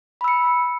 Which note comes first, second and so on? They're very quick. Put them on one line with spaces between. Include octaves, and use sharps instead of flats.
B5 E6 C#7